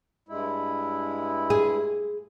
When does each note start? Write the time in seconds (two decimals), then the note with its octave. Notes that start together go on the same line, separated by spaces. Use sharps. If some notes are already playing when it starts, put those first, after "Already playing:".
0.29 G2 G#3 E4
1.50 G#4